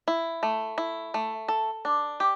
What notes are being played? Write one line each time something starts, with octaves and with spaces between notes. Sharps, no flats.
E4
A3
E4
A3
A4
D4
G4